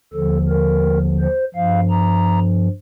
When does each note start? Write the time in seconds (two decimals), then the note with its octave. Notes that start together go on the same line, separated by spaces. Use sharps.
0.13 D#2 D3 F3 A4
0.49 A#4
1.20 C5
1.55 G2 F3 F5
1.90 A#5